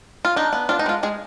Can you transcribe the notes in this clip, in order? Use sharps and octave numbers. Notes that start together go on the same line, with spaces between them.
F4
D4 D#4
B3
D4 F4
D#4
G#3 F4
G#3 G#4